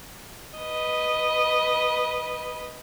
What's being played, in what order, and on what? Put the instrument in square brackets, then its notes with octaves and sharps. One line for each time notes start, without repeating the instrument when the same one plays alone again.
[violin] B4 D#5